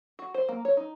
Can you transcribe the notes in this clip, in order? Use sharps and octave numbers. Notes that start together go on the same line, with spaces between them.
F#4
C5
A#3
C#5
D#4